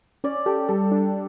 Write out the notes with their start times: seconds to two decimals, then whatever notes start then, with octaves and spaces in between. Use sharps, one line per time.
0.24 C#4 D5
0.46 G4 A4
0.68 G3 A4
0.91 D4